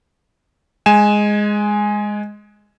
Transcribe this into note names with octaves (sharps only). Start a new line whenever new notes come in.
G#3 G#5 E7